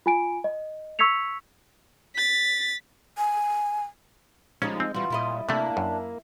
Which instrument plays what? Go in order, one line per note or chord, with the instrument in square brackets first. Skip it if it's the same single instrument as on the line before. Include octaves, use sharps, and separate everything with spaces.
[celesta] F4 G#5 D7
D#5
C#6 E6 G#6 B6 C#7 F7
[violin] A6 B6
[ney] G#5
[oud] F3 G3 D#4 [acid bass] G#3 [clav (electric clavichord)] C#4
[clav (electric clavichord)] C4
[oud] E3 F#4 [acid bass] G3 [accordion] F4
[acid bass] A#2 [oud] G3 E4 D#5
[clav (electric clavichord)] C3 A3 [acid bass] A#3 [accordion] D4 [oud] E4
[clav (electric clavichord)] F#2